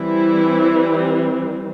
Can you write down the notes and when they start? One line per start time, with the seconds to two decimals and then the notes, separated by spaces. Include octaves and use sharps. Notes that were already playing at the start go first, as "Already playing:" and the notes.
Already playing: E3 G3 C4 E4